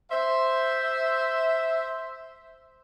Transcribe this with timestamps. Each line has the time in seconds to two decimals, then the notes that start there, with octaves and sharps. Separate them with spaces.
0.11 C5 E5